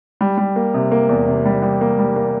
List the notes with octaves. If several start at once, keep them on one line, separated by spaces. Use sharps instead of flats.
G3
G3
A#3
C3
A#3
E2
C3
G3
G3
A#3
G3
A#3